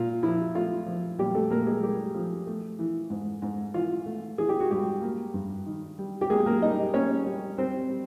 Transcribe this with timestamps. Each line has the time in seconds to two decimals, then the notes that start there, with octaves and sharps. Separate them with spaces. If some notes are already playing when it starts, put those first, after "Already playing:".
Already playing: A#2 F4
0.23 F3 E4
0.55 A3 F4
0.86 F3
1.19 A#2 G3 G4
1.35 A3 A4
1.51 A#2 A#3 A#4
1.66 G#3 G#4
1.83 G3 A3 G4
2.14 F3
2.47 A3
2.79 E3
3.10 G#2
3.42 G#2
3.74 E3 F4
4.06 A3
4.38 E3 G#4
4.49 G4
4.60 F#4
4.71 G#2 G3 G4
5.02 A#3
5.34 G2
5.66 D#3
5.99 G3
6.21 G4
6.30 G#3 A#3 G#4
6.46 A#3 A#4
6.62 G3 D#4 D#5
6.94 A#3 C#4 C#5
7.26 G3
7.58 G3 C4 C5
7.90 G3